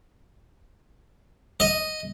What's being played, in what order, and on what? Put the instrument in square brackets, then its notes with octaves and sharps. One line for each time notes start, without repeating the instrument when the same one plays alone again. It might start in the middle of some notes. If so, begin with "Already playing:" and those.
[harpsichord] D#5